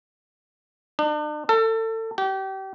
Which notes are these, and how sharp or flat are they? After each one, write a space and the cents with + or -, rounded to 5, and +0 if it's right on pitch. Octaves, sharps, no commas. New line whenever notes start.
D4 +40
A4 +30
G4 -30